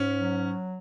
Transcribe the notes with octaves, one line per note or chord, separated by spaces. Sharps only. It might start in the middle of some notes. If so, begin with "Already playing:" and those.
Already playing: G#2 C#4
F#3